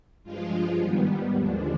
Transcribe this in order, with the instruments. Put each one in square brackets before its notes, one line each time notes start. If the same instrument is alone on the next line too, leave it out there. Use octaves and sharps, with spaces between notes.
[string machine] G2 F3 G#3 F4
G#2 D#3 G3 B3
D#2 D3 F3 G#3 D4